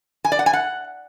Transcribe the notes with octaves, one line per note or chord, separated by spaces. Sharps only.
G#5
D5
F#5
G#5
F#5